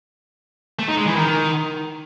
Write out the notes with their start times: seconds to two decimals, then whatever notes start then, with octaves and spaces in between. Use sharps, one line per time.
0.79 A3
0.88 D#4
0.97 G#3
1.06 E3
1.16 D#3